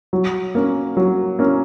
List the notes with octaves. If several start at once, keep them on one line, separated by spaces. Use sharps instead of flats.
F#3
A#3 C#4
F#3
A#3 C#4